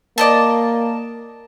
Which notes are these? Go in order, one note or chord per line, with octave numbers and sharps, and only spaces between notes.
A#3 D5 D#5 A5